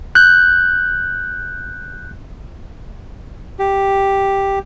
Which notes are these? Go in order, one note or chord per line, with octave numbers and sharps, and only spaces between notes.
F#6 G6
G4